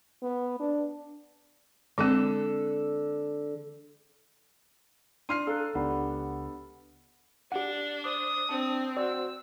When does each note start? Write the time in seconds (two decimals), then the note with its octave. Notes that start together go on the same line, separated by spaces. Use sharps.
0.22 B3
0.60 D4
1.98 D3 G#3 C4 A4
5.29 D4 C6 F6 C7 D#7
5.47 A4 F5 A#5 F#6
5.75 C#2 B3 D4 G4 F#5 B5
7.52 D4 G4 F#5
8.04 C5 D6 D#6
8.49 C4 D4 A5
8.97 F#4 C5 D5 F#5 E6